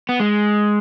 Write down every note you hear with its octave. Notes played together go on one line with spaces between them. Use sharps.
B3
G#3